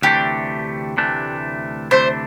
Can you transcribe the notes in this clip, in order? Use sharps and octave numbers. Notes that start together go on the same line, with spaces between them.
D2 C3 E3 A3 D4 G4
D2 C3 E3 A3 D4
D2 C3 E3 A3 D4 C5